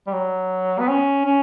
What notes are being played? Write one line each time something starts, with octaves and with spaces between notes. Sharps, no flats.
G3
F#3
B3
C#4
C#4